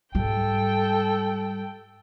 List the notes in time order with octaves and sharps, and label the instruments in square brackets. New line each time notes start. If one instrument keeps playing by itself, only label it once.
[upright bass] G#2 G3 [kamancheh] A4 G5